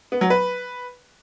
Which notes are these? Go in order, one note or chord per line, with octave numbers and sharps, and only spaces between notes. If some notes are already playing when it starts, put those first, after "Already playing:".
B3
F#3
B4